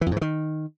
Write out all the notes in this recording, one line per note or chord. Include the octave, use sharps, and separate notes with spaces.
E3
F2
G#2
E3
D#3